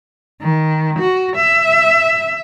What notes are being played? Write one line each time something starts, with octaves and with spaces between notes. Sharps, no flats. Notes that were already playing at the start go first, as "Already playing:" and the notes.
D#3
F#4
E5